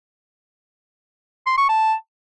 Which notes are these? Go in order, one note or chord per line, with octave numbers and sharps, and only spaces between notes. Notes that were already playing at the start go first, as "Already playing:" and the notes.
C6
C#6
A5